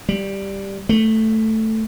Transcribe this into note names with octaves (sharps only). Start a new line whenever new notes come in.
G3
A3